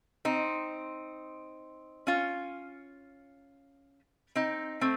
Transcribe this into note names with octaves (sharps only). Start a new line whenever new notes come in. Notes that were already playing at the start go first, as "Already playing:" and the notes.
C4 D#4
C#4 F4
C4 D#4
A3 C4